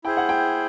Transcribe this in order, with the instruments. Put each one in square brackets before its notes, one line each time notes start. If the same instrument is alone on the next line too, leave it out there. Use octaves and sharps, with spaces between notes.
[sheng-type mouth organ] E4 G#4 C5 [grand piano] G5
[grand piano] F#5
G5